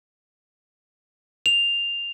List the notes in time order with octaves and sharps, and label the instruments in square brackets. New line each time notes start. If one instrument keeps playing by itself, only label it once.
[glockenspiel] F7